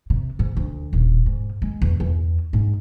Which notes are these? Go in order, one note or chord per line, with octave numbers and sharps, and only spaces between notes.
C3
G#2
D2
D#1
G#2
G#3
E2
E2
G#2